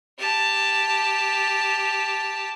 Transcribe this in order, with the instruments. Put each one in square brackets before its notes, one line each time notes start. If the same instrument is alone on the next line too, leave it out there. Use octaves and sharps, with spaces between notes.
[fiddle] G4 A5